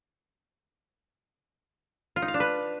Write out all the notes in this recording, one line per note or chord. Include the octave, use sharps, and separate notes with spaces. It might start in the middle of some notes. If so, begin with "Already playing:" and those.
F4
D#4
F5
D4
B4